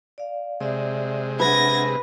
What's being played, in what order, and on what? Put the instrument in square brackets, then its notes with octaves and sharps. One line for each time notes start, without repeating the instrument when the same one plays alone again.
[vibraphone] D5 F5
[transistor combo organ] C3 G#3 [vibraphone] D5 E5
[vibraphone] D4 E5 F#5 [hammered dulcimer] B4 [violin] G#6 A#6